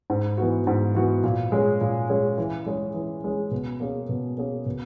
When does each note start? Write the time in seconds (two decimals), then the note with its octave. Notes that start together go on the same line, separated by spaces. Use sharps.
0.10 G#2
0.38 E3 B3 F#4
0.67 G#2
0.95 E3 B3 F#4
1.24 A#2
1.52 G#3 C#4 G#4
1.81 A#2
2.10 G#3 C#4 G#4
2.38 E3
2.66 G#3 C#4 G#4
2.94 E3
3.24 G#3 C#4 G#4
3.51 B2
3.80 A#3 C#4 G#4
4.09 B2
4.37 A#3 C#4 G#4
4.66 B2